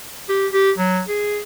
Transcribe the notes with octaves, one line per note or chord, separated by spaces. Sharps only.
G4
G4
F#3
G#4